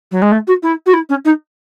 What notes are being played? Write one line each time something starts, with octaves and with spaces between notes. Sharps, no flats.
F#3
G#3
A3
F#4
E4
F#4
E4
C#4
D#4